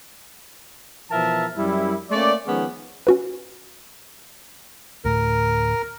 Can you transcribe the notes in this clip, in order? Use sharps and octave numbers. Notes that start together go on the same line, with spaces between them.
B2 E3 F3 A#4 E5 A5
F#2 G3 E4
A3 A#3 C#4 D5
D#3 F3 G#3 B3 C#4
C#4 F#4 B4
D2 A2 A#4